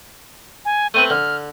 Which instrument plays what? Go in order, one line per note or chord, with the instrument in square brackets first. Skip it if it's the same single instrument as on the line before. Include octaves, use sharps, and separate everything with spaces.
[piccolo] G#5
[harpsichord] A3 C4 B4 [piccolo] D#7
[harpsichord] D3 [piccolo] F6